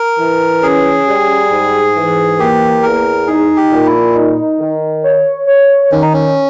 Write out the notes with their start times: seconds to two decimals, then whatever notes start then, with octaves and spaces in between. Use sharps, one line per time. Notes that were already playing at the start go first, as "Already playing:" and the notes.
Already playing: A#4
0.19 E3
0.63 C#4 G#4
1.07 G3
1.51 G#2
1.95 E3
2.39 A#3 G4
2.83 E2 A#4
3.27 D#4 G#4
3.56 G4
3.71 A#2
3.86 E4
4.15 D#4
4.60 D#3
5.03 C#5
5.47 C#5
5.92 D#3 C#4
6.02 D#4
6.13 C#4